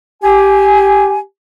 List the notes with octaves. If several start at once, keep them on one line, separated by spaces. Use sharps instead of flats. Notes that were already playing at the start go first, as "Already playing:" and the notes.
G4 G#5